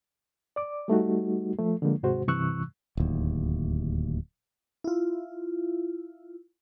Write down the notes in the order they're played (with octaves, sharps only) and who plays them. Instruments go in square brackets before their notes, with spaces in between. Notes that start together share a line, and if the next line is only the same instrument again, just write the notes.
[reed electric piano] D5 D6
G3 A3 D#4 F#4
F3 A3
D3 F3 G#3 A#3
D#2 G#2 C3 G#3 F#4 C5
G2 C3 E3 C#6 E6 F#6
[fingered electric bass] D1 D#2
[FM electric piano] E4 F4